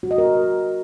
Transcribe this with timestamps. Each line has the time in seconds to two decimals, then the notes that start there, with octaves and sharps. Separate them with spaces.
0.03 F#4
0.11 D#5
0.18 A#4